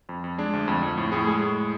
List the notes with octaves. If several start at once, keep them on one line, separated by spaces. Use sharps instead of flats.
F2
F2
G#3 D4
D2
F2
F2
A2
A2 G#4
G#3 G#4
A2